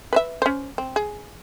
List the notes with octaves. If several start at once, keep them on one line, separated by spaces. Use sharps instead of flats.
B4 C5 E5
C#4 C5
C4
G#4